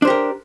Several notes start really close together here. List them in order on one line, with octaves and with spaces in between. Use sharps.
D4 C5 G4 A#4